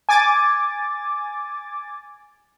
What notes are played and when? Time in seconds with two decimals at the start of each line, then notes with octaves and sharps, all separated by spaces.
0.09 G#5 D6 A6